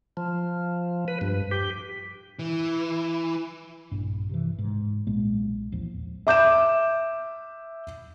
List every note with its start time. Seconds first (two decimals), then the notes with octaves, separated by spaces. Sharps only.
0.17 F3
1.08 B4
1.21 G2
1.51 G4
2.39 E3
3.92 A#1 G2
4.29 C3 D#3 E3
4.59 G#2
5.07 B1 A#2 G#3 A#3
5.72 A1 D#2 F3
6.27 E5 D6 G6 E7